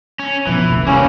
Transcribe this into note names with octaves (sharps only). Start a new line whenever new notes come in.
C#4
B2 E3 F3
F1 D2 A3
G3 A#3 C#4